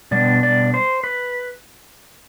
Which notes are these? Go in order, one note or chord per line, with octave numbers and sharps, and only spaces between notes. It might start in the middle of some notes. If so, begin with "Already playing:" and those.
B2 G3 B3 D4 D5
D5
C5
B4